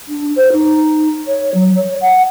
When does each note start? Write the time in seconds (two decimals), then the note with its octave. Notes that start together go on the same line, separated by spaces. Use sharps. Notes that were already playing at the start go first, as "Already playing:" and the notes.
0.08 D4
0.36 C5
0.52 D#4
1.27 C#5
1.54 F#3
1.75 C#5
2.01 F#5